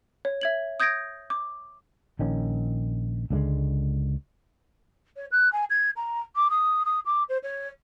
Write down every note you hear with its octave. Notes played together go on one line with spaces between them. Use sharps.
C#5
E5 G#6 F#7
D#6 G6 G#6 A#6 D7
D6
A#1 D#3 C#4
C#2 D3 E3 G#3
C#5
F#6
G#5
G#6
A#5
D6
D#6
D#6
D6
C5
C#5